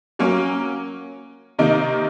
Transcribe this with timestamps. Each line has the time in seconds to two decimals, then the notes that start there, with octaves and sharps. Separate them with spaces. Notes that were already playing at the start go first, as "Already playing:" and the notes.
0.19 F#3 A#3 C#4
1.59 C3 D#3 A#3 D#4